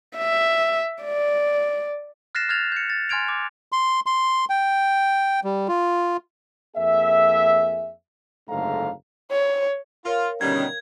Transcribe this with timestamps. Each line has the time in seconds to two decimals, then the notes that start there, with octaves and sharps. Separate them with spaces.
0.17 E5
1.04 D5
2.35 F6 F#6 A6 A#6 C7 E7
2.49 F6 F#6 G#6 A6 F7
2.72 G6 C#7
2.90 A6
3.09 G#5 C6 F6 G#6 D7 F7
3.28 D6
3.72 C6
4.06 C6
4.50 G5
5.44 G3
5.68 F4
6.77 F2 A#3 G#4 E5
8.49 F#1 G#2 D3 A3 F5 A#5
9.31 C#5
10.05 F4 A#4 C#5 F5
10.41 B2 D3 D#3 G3 B3 C#4 G#6